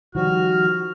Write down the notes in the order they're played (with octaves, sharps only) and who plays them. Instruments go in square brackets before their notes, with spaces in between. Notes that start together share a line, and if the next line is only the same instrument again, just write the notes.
[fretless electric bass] D#3 F3 G3 [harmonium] F#4 [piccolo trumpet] F6